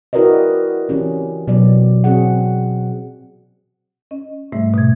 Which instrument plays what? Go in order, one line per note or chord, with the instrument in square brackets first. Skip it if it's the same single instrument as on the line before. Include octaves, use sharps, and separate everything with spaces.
[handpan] E4 F#4 A#4 B4 D5 D#5
E3 C4 C#4 G4
B2 F#3 B3 D5
C4 F#4 G#4 F#5
[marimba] C#4 D#5
G#2 C3 G3 A3 E5
B2 G#6